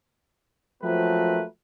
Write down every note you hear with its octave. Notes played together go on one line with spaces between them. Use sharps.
F3 F#3 A3 A#3 C4 B4